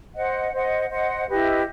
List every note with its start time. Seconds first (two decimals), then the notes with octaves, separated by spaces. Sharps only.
0.14 C5 D#5 F#5
0.52 C5 D#5 F#5
0.90 C5 D#5 F#5
1.28 E4 G4 B4 D#5